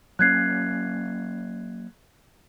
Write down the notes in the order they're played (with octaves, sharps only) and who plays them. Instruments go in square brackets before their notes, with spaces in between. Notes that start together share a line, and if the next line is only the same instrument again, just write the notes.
[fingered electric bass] F#3 A#3 C#4 [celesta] F#6 G#6 C7